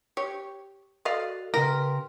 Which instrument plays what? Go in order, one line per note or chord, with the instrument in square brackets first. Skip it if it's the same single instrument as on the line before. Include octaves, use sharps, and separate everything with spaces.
[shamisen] G4 C#5
[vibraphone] F#4 A4 [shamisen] D5 D#5 F5
[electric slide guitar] C#3 G4 [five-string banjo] A#4 [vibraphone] B4 C6